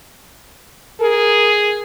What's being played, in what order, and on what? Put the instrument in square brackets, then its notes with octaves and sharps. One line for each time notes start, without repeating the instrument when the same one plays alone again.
[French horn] G#4 [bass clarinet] A#4